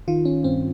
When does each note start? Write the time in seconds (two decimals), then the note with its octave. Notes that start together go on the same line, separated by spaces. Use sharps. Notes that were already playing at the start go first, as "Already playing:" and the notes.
0.08 D#3 F4
0.25 C#4
0.44 G2 C4